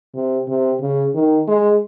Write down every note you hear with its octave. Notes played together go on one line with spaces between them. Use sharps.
C3
C3
C#3
D#3
G#3